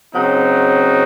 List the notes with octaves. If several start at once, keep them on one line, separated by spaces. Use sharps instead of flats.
C#3 F#3 C4 D#4